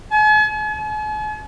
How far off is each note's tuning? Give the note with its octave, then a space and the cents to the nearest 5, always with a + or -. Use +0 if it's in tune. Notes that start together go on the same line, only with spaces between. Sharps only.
G#5 +45
G#5 +45